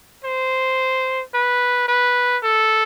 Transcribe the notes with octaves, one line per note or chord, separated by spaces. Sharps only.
C5
B4
B4
A4